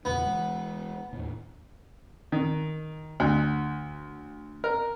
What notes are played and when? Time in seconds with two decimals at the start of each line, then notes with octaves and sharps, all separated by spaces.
0.05 E2 A#2 C#3 B3
0.26 E3 G#3
1.13 D#2 A2
2.32 D#3
3.20 D2
4.64 A#4